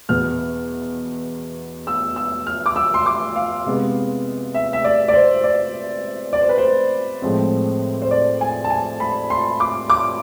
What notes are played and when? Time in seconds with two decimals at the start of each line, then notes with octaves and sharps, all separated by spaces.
0.09 E2 B2 B3 F6
1.87 E6
2.16 E6
2.47 F6
2.66 D6
2.76 E6
2.94 C6
3.06 D6
3.36 F5
3.66 C3 G#3 B3
4.54 E5
4.73 E5
4.84 D5
5.08 D5
5.14 C5
5.44 D5
6.33 D5
6.41 C5
6.49 B4
6.58 C5
7.22 A2 F3 G#3 C4
8.02 C5
8.11 D5
8.41 G#5
8.64 A5
8.70 G#5
9.00 B5
9.30 C6
9.60 D6
9.90 D6